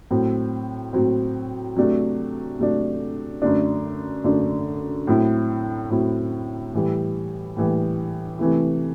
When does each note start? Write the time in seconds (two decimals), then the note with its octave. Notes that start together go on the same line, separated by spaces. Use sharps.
0.11 A2 F#3 C4
0.93 A2 F#3 C4
1.76 C3 F#3 A3 D4
2.59 C3 F#3 A3 D4
3.42 F#2 D3 A3 D4
4.24 F#2 D3 A3 D4
5.07 A2 F#3 C4 E4
5.90 A2 F#3 C4 E4
6.74 A2 E3 G3
7.57 A2 E3 G3
8.39 C3 E3 A3 E4